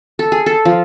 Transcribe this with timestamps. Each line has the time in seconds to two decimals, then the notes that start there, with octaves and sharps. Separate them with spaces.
0.19 A4
0.32 G#4
0.46 A4
0.65 F3